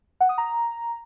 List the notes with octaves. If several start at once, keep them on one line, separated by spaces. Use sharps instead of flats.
F#5
D#6
A#5